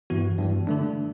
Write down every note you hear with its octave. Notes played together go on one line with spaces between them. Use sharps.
G2 E3 B3 F#4
G2 E3 G3
D3 A3 D4